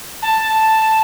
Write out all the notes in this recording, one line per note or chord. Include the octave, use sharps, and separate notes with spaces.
A5